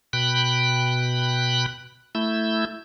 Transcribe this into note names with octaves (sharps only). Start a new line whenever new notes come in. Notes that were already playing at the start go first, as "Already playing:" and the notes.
B2 G5 B5 F#6
A3 E4 E6 G6